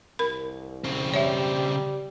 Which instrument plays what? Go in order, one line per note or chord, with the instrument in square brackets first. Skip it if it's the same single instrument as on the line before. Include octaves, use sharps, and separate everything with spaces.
[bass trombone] C2 [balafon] A#4 B5
[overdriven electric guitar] C#3 C4
[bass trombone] G3 [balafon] C#5 E5